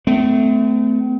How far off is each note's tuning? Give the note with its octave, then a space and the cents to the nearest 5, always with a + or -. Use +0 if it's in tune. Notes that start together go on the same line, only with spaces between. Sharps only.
A3 +0 C4 -45